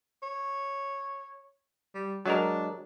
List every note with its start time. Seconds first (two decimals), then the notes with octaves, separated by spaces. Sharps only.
0.23 C#5
1.95 G3
2.26 F#3 G#3 D4 A#4